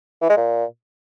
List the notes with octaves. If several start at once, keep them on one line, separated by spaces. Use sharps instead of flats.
E3
G#3
A#2